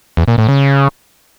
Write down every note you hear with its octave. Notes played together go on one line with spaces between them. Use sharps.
E2
A#2
A2
C#3